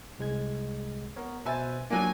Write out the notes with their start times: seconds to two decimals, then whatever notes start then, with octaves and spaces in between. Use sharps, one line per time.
0.19 C2 G#3 G#6
1.16 B3 A#4 C#5
1.45 B2 B4 C5 E5 G#5 A6
1.90 F3 F#3 A#3 D4 G#5